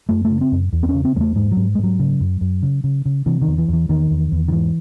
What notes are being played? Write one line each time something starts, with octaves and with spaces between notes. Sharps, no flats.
F#2 A3
A3
C#3
C4
F#2
E2
C4
C#4
C#3
C4
E2 G#3
A3
G#2 G#3
F#3
G#2
G#3
G#2 F#3
C#3
F#2
F#2
C#3
C#3
C#3
C3 E3
D#3
E2
E3
E2 E3
E2 D#3
E2
E2
D#3
G#2 E3